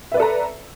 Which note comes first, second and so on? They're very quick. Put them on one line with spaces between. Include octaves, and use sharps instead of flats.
E5 B4 D5 A4 A#5